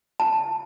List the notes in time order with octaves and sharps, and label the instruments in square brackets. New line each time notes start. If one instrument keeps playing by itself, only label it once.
[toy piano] A5